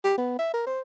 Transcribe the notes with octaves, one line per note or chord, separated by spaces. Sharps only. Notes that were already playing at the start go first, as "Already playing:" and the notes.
G4
B3
E5
A#4
C5